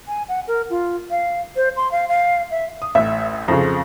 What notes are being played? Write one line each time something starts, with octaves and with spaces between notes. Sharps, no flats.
G#5
F#5
A#4
F4
F5
C5
C6
F5
F5
E5
D#6
A1 A2 E5 E6
F2 C#3 F4 G#4 C5